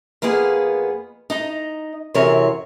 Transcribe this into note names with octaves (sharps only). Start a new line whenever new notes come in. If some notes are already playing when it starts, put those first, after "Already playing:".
F2 A#3 B3 G#4 F5
D#4 D#5 A#5
F#2 C3 E3 C4 A#4 C#5